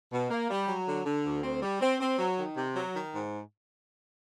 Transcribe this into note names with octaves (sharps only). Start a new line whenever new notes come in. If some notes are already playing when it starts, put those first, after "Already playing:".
B2
A#3
G3
F#3
D3
D3
D2
C4
G3
C4
C4
F#3
D#3
C3
F#3
D#3
G#2